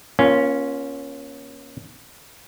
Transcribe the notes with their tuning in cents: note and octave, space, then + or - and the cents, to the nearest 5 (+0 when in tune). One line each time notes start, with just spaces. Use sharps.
A#3 +40 C#4 +0 F4 +0